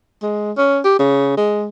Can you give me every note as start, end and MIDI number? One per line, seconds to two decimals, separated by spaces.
0.23 0.52 56
0.57 0.79 61
0.84 0.96 67
0.99 1.35 49
1.37 1.67 56